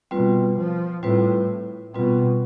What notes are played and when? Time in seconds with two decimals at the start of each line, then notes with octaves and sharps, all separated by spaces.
0.11 B2 G3 C4 F4 B4
0.57 F3
1.03 A2 G3 C4 F4 B4
1.94 B2 G3 C4 F4 B4